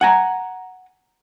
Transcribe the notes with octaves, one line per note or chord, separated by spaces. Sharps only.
F#5 G#5 A#5